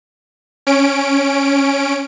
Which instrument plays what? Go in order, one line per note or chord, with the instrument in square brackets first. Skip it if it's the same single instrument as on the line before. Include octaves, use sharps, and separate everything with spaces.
[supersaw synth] C#4 D7